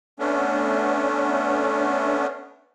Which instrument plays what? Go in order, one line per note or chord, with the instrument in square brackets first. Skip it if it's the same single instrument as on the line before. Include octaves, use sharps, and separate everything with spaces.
[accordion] A3 B3 C#4 D4